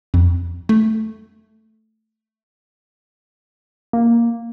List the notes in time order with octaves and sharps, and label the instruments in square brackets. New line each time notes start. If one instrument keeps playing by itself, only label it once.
[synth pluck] F2
A3
[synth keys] A#3